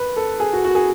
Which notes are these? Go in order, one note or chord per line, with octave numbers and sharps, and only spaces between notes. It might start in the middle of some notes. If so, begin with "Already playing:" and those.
Already playing: B4
A4
G#4
F#4
F#4
G#4